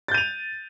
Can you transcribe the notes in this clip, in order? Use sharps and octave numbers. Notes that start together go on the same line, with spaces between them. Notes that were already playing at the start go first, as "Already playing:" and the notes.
G6 A6 D#7 F7